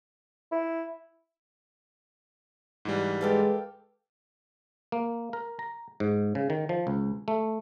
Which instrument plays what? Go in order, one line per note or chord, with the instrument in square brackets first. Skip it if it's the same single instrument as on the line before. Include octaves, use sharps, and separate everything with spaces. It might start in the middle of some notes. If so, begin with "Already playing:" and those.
[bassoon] E4
[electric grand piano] G#2 E3 G3
[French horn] G#3 [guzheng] G4 A4 F5 [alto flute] B4
[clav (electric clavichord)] A#3
A#4
A#5
G#2
C#3
D#3
F3
C#2
A3